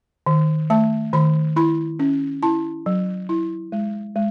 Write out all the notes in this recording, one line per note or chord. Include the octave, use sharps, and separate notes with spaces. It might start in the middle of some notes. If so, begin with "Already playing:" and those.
D#3
A3 A5
D#3 B5
E4 B5
C#4
E4 A5
F#3
E4
G#3
G#3